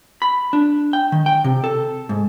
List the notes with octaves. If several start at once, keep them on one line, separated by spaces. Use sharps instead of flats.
B5
D4
G5
D#3
G5
C3
A4
G#2